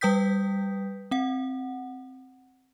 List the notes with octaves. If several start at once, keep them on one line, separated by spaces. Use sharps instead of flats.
G3 B4 G5 D#6 G6 B6
C4 F#5